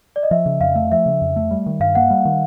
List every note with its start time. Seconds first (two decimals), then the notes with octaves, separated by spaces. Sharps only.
0.16 D5
0.23 D#5
0.31 F3 E5
0.46 C#3
0.61 F2 F5
0.75 A3 F5
0.92 F3 E5
1.06 C#3
1.21 F2
1.36 A3
1.51 G3
1.66 D#3
1.80 G2 F5
1.95 A#3 F#5
2.10 G3
2.25 D#3